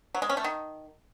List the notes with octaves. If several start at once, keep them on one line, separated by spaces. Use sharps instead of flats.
F#3
G#3
C#4
A3
D#3